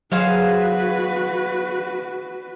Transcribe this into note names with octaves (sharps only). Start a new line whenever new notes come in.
F#3 F#4 G#4 B4 C5 F5